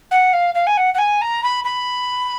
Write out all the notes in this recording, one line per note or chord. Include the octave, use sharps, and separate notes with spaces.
F#5
F5
F5
G#5
F#5
F#5
G#5
A#5
B5
B5